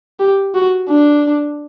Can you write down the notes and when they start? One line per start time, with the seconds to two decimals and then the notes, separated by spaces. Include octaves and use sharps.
0.20 G4
0.55 F#4
0.89 D4